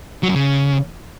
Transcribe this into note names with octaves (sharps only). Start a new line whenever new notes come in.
F#3
F#2
C#3